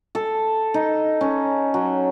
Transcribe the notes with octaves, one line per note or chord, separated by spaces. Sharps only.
A4
D#4
C#4
F#3